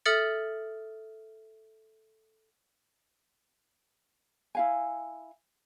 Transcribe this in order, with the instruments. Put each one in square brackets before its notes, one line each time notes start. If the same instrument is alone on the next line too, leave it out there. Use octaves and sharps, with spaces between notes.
[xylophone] A4 E5 D#6 F6 A6 C#7
[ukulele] E4 F5 G#5